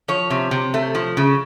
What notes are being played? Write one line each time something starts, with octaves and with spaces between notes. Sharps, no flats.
F3 C#5
C3
C3
A3
F3
C#3